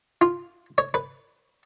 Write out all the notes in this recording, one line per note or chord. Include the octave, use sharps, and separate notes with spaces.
F4
C#5
B4